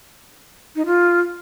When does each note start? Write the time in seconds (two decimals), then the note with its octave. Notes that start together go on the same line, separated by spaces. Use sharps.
0.76 D#4
0.86 F4